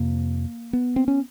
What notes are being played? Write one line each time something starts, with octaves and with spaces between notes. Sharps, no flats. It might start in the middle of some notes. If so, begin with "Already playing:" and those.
Already playing: F2 C3 A#3
B3
C4
C#4